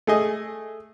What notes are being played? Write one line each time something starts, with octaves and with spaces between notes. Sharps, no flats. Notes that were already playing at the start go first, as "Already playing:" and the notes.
A3 G#4 D#5